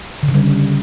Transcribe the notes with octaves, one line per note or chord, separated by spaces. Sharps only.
D3
C#3
G3